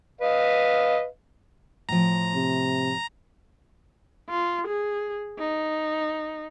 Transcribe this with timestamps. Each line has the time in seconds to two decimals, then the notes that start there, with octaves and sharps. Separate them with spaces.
0.21 B4 D#5 F5
1.89 A2 F3 A#5
2.35 C3
4.30 F4
4.68 G#4
5.39 D#4